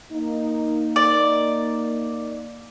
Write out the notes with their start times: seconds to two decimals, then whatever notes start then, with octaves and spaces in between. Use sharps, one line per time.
0.12 A#3 D#4
0.96 D5